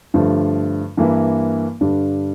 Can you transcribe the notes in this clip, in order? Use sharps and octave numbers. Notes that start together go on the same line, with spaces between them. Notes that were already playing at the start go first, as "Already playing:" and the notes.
G2 D3 F3 A3
G2 E3 A#3 E4
G2 D3 G3 D4